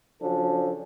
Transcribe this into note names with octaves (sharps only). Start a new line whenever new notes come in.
C#3 F3 F#3 C#4 D4 A4